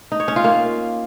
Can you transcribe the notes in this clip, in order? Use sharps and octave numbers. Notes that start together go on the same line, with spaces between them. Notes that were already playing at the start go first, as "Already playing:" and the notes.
D#4
C#5
C#4
F4
A#3